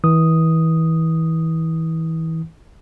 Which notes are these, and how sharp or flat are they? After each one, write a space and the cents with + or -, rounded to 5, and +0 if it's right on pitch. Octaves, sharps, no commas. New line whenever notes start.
E3 -30 D#6 +0